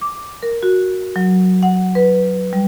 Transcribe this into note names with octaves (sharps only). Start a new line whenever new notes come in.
D6
A#4
F#4
F#3
F#5
B4
G3